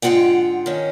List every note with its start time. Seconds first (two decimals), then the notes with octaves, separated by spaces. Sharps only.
0.02 G#2 D3 G#3 F4 F#5 G5
0.66 D#3 C#4